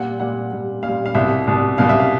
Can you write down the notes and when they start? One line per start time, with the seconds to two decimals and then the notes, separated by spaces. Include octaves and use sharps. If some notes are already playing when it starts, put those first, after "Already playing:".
Already playing: A#2 G3 F#5
0.20 A#2 G3 F#5
0.52 A#2 G3
0.83 A#2 F5
0.88 G3
1.06 F5
1.14 C2 B2 G3 E5
1.47 C2 B2 G3
1.78 C2 B2 G3 F5
1.89 E5
2.00 F5